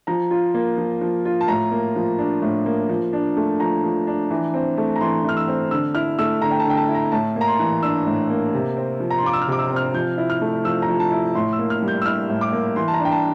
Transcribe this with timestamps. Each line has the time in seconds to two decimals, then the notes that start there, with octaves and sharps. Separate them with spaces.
0.07 F3 A#5
0.31 F4
0.54 A#3
0.78 F3
1.01 F3
1.25 F4
1.41 A5
1.48 A2 A#5
1.72 A#3
1.96 F3
2.18 D4
2.42 A2
2.66 A#3
2.89 F3
3.13 D4
3.37 A3
3.60 F3 A#5
3.84 F3
4.07 D4
4.31 E3
4.54 C4
4.78 A3
4.96 A#5
5.01 E3 C6
5.24 E3 F6
5.37 E6
5.48 C4
5.71 D3 E6
5.95 E4 F6
6.19 A3 E6
6.41 D3 A#5
6.51 G5
6.60 A5
6.65 D3 G5
6.77 A5
6.89 E4
6.94 A#5
7.12 A2 A5
7.36 A#3
7.41 A#5
7.48 C6
7.59 E3
7.82 D4 E6
8.07 A2
8.30 A#3
8.54 C3
8.77 C4
9.00 F3
9.10 A#5
9.18 C6
9.24 F4 D6
9.33 E6
9.42 F6
9.48 C3 D6
9.59 E6
9.71 C4
9.76 F6
9.94 F3 G6
10.18 E4
10.30 F6
10.41 A3
10.65 F3 E6
10.82 A#5
10.88 F3
11.00 A5
11.12 E4
11.35 A2 C6
11.53 E6
11.59 A#3
11.70 F6
11.82 G3
11.88 G6
12.02 E6
12.05 E4 F6
12.29 A2
12.41 D6
12.53 A#3
12.76 E3 C6
12.88 A5
12.94 A#5
12.99 D4
13.05 G5
13.12 A5